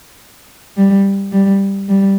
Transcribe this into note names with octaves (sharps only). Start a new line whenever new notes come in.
G3
G3
G3